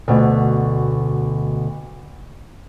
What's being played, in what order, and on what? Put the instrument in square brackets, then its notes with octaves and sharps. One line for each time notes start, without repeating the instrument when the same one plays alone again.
[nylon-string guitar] D2 B2